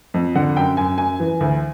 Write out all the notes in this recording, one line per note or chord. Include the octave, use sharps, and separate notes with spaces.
F2
D3 F#5
F#2 G5
F#2 G#5
F#2 G#5
E3
D2